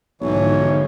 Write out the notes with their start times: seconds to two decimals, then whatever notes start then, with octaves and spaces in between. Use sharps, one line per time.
0.22 B1 G#2 B2 D3 E3 F3 C#5